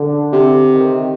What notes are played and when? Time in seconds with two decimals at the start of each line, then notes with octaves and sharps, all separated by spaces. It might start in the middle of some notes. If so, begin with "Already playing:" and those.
Already playing: D3
0.32 C3
0.71 D#3